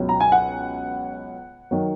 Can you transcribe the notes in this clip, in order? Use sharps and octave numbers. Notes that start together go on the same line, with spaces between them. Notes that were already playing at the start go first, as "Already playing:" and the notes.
Already playing: C#2 B2 F#3
A#5
G#5
F#5
D#3 F#3